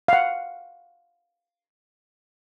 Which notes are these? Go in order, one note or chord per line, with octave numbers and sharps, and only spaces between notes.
F5 F#5